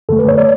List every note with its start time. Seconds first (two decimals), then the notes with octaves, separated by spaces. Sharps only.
0.09 F#2 D3 A3 A4
0.19 B4
0.28 C#5
0.38 D5